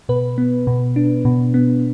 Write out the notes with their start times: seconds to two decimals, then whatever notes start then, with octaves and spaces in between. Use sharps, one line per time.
0.09 B2 B4
0.38 B3
0.67 B2
0.96 D4
1.25 B2
1.54 B3